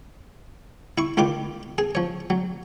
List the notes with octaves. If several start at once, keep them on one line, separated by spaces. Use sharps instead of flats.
E4 C#6
C#2 D#3 F4 B5 D6
G#4
F3 C#5
F#3